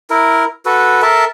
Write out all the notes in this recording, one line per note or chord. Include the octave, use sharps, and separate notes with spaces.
E4 A#4
F#4 A4 B4
A4 A#4 E5 A5